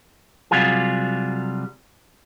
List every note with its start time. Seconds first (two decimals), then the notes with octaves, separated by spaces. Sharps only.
0.51 C3 F#3 G3 F4 G#4